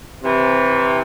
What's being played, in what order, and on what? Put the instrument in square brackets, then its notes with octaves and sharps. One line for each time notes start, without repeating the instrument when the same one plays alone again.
[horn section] C3 E3